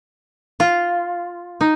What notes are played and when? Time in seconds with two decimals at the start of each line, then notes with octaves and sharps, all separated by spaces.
0.60 F4
1.61 D#4